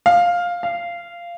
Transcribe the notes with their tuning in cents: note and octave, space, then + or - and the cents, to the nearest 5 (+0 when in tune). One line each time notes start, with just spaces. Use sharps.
F5 +5
F5 -15